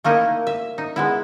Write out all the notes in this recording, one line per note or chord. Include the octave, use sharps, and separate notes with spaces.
A3 A#3 D#4 E4
E5
D#4
G#3 B3 E4